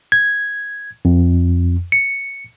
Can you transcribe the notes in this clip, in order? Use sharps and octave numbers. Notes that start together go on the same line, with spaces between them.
G#6
F2
C#7